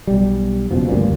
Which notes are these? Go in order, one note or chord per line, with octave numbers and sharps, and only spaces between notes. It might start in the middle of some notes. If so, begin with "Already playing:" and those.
B1 G3
F#1 F2 B2 F3
D2 G2 A#2